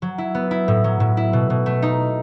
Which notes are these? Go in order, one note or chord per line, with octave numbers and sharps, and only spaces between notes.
F#3
E4
B3
E4
A2
F#3
A2
E4
B2
B2
A3
D#4